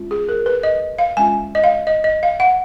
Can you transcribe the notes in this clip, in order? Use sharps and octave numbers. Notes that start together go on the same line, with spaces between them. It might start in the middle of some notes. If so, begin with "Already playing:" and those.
Already playing: G#3 C#4 F4
G#4
A#4
B4
D#5
F5
G#3 C#4 F4 G#5
D#5
F5
D#5
D#5
F5
F#5